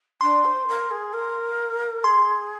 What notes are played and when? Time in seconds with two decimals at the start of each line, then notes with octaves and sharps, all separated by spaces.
0.21 D4 C6
0.44 C5
0.68 A#4
0.90 G#4
1.13 A#4
2.03 G#4 C6